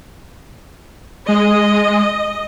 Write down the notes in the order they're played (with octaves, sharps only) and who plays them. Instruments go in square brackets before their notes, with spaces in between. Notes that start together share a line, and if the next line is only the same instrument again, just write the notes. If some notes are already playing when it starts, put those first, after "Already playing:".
[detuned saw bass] G#3 [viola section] D#5